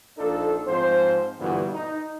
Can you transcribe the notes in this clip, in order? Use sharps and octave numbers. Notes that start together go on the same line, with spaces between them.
A#1 D4 D#4 F4 A4
G#2 F3 C4 C5
G2 A#2 D3 E3 B3 F#4
D#4